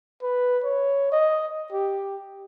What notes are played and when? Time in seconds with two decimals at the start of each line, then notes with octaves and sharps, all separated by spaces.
0.22 B4
0.64 C#5
1.12 D#5
1.72 G4